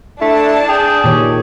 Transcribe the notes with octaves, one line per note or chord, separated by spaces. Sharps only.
A3 D4 E4 A5
G#4 G5
A#2 D#3 G4 C#5